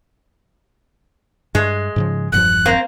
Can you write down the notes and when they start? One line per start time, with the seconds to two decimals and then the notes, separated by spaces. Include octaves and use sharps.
1.55 G2 G#3
1.96 G#2 C#3 F3
2.32 E1 G2 F3 F#6
2.66 A#3 C4